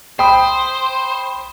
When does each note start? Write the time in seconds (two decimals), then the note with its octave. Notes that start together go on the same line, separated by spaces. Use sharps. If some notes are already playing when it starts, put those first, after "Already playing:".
0.19 C5 G5 B5 D#6